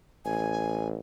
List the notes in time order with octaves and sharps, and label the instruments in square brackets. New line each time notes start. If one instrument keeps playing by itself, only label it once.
[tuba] A1 [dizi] G#5